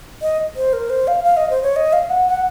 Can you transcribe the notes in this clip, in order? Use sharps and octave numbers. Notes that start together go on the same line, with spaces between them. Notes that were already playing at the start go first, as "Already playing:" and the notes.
D#5
C5
A#4
C5
F5
F5
D#5
C5
C#5
D#5
F5
F#5
F#5